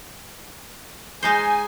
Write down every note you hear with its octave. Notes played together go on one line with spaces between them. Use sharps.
G#3 D#4 C5 G#5